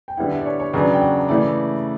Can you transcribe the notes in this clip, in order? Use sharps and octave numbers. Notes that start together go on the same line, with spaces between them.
G5
D3 G3 B3 E4 F#5
E5
D5
C#5
C#5
E2 C#3 F#3 B3 D4 D5
G5
F#5
C#3 E3 A3 E4 D5